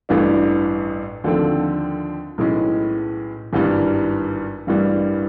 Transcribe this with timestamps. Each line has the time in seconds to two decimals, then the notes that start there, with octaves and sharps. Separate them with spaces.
0.09 A1 G2 E3 A3 D4
1.24 D#2 D3 F3 A3 C4
2.38 B1 A2 E3 G#3 C#4
3.53 G#1 G2 E3 G3
4.67 A1 G2 E3 G3 A#3